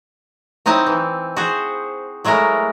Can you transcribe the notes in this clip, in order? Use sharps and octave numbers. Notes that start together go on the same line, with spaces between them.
F#3 C4 D#4 E4 D#5 A5
E3
F#4 G#4 C5
F#3 G#3 A3 E4 A#4